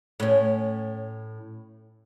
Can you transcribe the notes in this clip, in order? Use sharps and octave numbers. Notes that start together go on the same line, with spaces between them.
A2 C#4